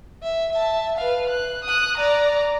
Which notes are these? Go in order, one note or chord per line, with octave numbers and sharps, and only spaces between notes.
E5
E5 A5
B4 F5
F#6
D#6 F#6
D5 A#5